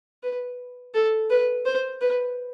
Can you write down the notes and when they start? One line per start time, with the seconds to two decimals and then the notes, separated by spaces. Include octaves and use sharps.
0.23 B4
0.94 A4
1.30 B4
1.66 C5
2.01 B4